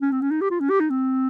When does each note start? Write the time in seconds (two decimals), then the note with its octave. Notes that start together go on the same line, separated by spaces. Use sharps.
0.02 C#4
0.12 C4
0.22 C#4
0.31 D#4
0.41 G4
0.51 F4
0.60 C#4
0.70 G4
0.80 D#4
0.90 C4